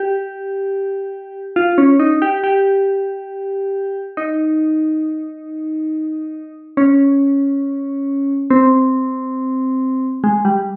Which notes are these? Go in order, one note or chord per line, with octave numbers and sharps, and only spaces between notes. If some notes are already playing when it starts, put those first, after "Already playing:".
Already playing: G4
F4
C#4
D#4
G4
G4
D#4
C#4
C4
G#3
G3